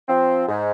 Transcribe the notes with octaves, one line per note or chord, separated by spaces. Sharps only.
F3 C4
G#2